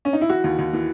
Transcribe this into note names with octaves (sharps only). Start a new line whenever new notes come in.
C#4
D#4
E4
E3 F#4
D#2
D#2
E3